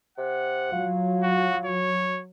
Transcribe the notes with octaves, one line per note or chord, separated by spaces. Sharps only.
C3 F#5
F#3 F4
F#4
C#5